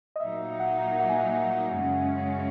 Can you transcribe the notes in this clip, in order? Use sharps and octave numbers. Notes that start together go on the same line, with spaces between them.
D#5
A#2 F#3 A#3 D#4 E5
F#5
F#5
G#5
F#5
F#2 C#3 G#3 C#4